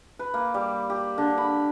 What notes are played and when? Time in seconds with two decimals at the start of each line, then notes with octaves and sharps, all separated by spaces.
0.19 B4
0.34 A#3
0.54 G3
0.90 G4
1.18 D3
1.38 B5